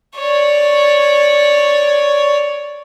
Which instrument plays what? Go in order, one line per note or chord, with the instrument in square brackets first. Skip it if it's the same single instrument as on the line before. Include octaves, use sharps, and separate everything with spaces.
[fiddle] C#5 D5